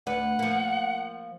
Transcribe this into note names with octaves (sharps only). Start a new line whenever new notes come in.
D2 B4 F#5
F3 A#3